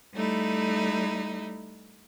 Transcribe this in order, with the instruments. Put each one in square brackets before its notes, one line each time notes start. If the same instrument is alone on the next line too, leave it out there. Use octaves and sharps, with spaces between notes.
[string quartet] G3 A3 D#4 E4